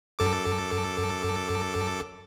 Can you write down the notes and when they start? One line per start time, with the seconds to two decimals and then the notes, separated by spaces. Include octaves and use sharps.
0.19 F#2 A4 D6